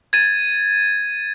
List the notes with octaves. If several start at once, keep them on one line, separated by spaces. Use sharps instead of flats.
G#6 A6 D#7